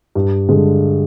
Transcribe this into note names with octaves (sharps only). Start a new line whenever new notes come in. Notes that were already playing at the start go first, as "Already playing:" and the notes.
G2
D3 G#3